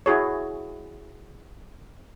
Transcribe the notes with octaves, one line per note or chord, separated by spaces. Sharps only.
E4 F#4 G#4 C#5